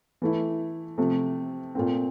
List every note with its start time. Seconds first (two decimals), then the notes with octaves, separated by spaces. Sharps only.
0.22 E3 A3 E4
0.98 C3 F3 A3
1.75 A#2 A3 C4